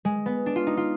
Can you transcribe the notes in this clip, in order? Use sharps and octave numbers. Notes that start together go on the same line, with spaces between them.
G#3
B3
D4
F4
D#4
F4